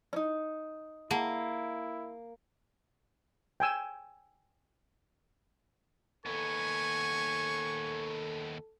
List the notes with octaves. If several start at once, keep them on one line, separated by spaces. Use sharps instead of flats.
C#4 D#4
A#3 E4 G#4 F#5 A5
G5 G#5 E6
D#2 B3 A4 G#5 C#6